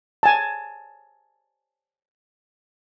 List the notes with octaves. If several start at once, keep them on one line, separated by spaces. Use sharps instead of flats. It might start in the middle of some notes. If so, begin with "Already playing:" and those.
G#5 A5